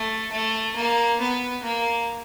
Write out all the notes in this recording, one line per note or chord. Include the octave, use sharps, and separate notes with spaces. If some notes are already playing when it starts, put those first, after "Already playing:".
Already playing: A3
A3
A#3
B3
A#3